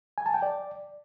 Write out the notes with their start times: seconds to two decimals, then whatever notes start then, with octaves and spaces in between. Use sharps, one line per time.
0.18 G#5
0.26 A5
0.34 G5
0.42 D5